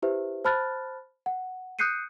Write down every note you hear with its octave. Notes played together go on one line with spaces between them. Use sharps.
E4 G4 B4 C5 E5
C5 A5 B5 F6 F#6 A6
F#5
D#6 F#6 G6 C7 C#7 D#7